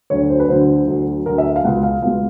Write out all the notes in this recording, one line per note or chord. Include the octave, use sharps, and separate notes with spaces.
D2 D3 F#3 C#5
C5
B4
D2 D3 F#3 C5
D2 D3 F#3
D2 D3 F#3 A#4
E5
F5
C#2 B2 G#3 F#5
F5
C#2 B2 G#3 F5